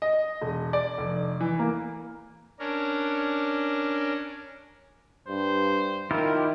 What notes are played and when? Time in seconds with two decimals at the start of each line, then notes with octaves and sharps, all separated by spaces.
0.02 D#5
0.42 E1
0.73 D5
0.98 F1
1.40 E3
1.59 A#3
2.59 C#4 D4 A#4
5.28 G2 C5
6.11 D#3 E4 F4 G4 A#4